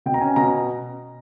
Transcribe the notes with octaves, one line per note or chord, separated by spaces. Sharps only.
B2 G5
A#5
C#4 G#5
B2 A#5